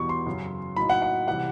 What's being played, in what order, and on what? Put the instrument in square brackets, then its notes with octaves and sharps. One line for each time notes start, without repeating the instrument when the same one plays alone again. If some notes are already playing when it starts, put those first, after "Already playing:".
Already playing: [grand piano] E2 B2 G3 B3 C#6
C6
F#2 C#3 F#3
A2 F#3 A#3 D#4 B5
F#5
F#5
C3 E3 G3 F#5